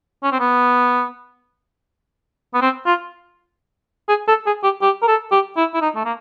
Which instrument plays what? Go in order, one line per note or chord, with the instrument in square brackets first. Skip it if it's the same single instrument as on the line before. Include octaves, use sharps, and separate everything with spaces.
[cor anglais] C#4
C4
B3
B3
C4
F4
G#4
A4
G#4
G4
G4
A#4
A4
G4
E4
E4
D#4
A3
A#3